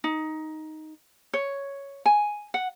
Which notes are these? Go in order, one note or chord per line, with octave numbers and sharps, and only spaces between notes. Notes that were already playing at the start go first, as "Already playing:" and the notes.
D#4
C#5
G#5
F#5